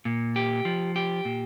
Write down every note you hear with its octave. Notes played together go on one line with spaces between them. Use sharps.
A#2
G4
F3
G4
A#2